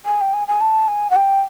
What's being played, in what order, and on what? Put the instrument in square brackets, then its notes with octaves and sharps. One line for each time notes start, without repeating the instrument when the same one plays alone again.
[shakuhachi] G#5
G5
G#5
G#5
A5
G#5
F#5
G5